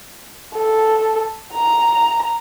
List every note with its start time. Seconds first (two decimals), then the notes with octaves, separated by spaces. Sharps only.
0.55 A4
1.53 A#5